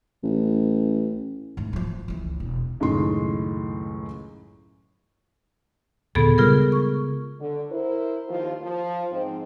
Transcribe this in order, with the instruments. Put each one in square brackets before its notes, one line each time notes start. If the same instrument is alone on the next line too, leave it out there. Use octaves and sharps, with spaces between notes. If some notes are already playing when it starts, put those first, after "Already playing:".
[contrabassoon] A1
[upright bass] G#2 A3
E3 F3
C#2 E3
E1
[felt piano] C#2 F#2 A2 D#3 D#5 C6
[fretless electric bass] D#2 A#2 D3 [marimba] B3 G#4 A4
[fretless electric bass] C#3 G3 G#3 [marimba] F4 G#4 A#4
[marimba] C#6
[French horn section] D3
E4 A#4 C5
D#2 F3 F4
F3
G#2 C4